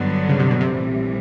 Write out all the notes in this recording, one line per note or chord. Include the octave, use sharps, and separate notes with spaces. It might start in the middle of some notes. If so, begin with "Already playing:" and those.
Already playing: G1 G2 D3 F#3 B3
C#3
C3
B2
C3
A#1 A2 E3 G3